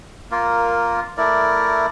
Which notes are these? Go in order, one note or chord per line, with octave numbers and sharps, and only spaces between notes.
A#3 F4 A#4
A3 E4 A#4 D5